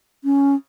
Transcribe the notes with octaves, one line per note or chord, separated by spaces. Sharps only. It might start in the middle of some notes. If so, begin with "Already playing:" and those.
C#4